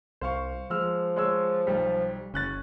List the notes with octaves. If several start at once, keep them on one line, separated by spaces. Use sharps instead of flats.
C2 C5 F5 C#6
F3 G#3 E6 F6
G#3 C#5 E6
B1 G3
F#1 C#4 F#6 A6